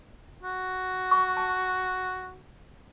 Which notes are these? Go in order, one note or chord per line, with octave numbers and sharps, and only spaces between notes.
F#4
C#6
A5